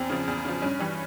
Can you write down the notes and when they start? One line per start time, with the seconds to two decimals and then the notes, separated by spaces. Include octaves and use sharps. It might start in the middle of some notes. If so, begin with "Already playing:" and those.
Already playing: E2 C4
0.10 C#3 F3
0.27 E2
0.45 C#3 F3
0.62 G2 C#4
0.79 E3 G3